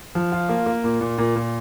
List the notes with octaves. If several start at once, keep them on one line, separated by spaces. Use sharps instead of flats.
F3
F4
A#3
A#3
A#2
A#2
A#2
A#2